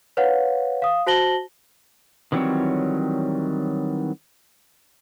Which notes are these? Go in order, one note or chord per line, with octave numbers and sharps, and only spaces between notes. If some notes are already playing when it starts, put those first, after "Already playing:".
B4 C#5 F5 F#5
F5 D#6
F#4 C5 A5 A#6 F#7 G7
D#3 E3 F#3 G3 C4 C#5